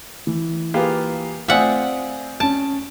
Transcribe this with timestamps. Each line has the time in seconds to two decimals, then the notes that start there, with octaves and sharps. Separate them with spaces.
0.27 E3
0.74 A#3 F4 G4 G#4 B4
1.48 A3 C4 F4 D5 E5 F#5 G#5 D#6
2.40 C#4 A5 D7